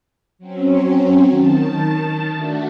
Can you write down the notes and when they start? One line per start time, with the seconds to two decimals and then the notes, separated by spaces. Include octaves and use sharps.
0.39 F#3 C4 C#4
1.28 D#3 A5
2.33 A3 D4 F#4